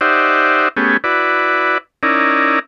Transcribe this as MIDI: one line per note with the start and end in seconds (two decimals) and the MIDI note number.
0.01 0.68 63
0.01 0.68 67
0.01 0.68 72
0.01 0.68 74
0.01 0.68 76
0.01 0.68 78
0.77 0.97 57
0.77 0.97 59
0.77 0.97 61
0.77 0.97 67
0.77 0.97 68
1.04 1.78 64
1.04 1.78 66
1.04 1.78 71
1.04 1.78 74
2.03 2.59 61
2.03 2.59 63
2.03 2.59 64
2.03 2.59 70
2.03 2.59 74